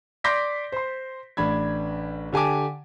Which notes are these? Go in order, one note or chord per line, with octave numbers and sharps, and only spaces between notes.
D5 C6 D6 G6 A#6 B6
C5 C6
A1 D4 B5 G#6
D3 G4 G#5 A5 D6